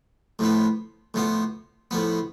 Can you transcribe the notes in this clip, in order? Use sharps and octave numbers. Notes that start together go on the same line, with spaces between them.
A2 F3 B3
A2 F3 B3
A2 F3 B3